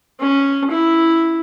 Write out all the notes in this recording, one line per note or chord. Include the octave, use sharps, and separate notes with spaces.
C#4
E4